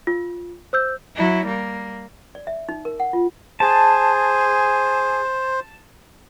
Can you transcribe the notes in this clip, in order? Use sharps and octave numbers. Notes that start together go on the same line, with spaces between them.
F4
C5 E6 G6
F#3 E4
G3 A#3
D5
E5
D#4
A#4
F#5
F4
G#4 C5 A5